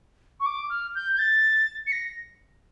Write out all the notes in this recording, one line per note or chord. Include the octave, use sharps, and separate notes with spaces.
C#6
D6
F6
G6
G6
A6
C#7
A#6